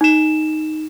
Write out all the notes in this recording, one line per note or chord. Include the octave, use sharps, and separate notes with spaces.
D#4 E7